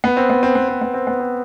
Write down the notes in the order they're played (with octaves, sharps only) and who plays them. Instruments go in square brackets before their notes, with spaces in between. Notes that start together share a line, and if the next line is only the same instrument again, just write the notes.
[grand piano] B3
C4
B3
C4
B3
C4
B3
C4
B3
C4